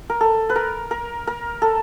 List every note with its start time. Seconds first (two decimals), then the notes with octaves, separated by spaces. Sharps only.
0.10 A#4
0.21 A4
0.49 B4
0.56 A#4
0.91 A#4
1.27 A#4
1.62 A4